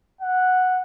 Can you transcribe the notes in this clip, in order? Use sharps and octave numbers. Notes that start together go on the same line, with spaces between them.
F#5